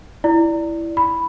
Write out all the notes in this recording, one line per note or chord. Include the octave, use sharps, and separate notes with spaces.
E4 D5
B5